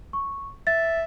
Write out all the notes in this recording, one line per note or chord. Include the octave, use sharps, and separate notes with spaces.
C#6
E5 A6